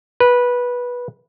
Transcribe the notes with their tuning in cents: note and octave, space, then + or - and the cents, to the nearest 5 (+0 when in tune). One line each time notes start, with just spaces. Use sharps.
B4 -15